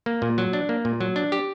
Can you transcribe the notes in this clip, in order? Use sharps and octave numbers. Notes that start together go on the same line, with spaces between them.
A#3
A#2
F#3
D4
A#3
A#2
F#3
D4
G4